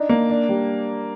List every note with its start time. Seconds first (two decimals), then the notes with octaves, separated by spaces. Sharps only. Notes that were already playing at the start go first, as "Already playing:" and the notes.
Already playing: D4 D#4
0.09 A#3
0.30 D4
0.49 G3